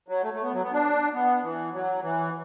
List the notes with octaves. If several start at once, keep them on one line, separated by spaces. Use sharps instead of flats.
F#3
A3
A3
B3
F#3
B3
D4
B3
E3
F#3
E3